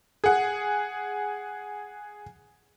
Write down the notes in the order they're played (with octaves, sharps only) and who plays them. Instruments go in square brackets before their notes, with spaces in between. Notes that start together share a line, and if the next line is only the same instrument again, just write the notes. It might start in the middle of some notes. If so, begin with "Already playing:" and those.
[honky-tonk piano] G#4 F#5